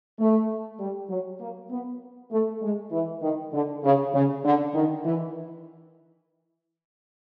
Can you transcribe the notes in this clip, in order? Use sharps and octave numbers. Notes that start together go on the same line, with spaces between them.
A3
G3
F#3
A#3
B3
A3
G#3
E3
D#3
D3
C#3
C#3
D3
D#3
E3